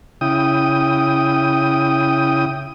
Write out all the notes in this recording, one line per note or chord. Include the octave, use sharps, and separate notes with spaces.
C#3 E4 G5 D#6